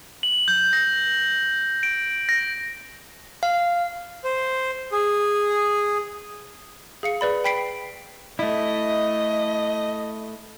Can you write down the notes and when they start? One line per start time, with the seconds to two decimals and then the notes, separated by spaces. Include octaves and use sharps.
0.23 F#7
0.48 G6
0.73 A#6
1.83 D7
2.29 A#6
3.43 F5
4.24 C5
4.92 G#4
7.03 G#4 F5 C#7
7.21 G#4 B4 D5 B5
7.44 G5 B5 B6 C7 D7
8.39 A3 E4 D#5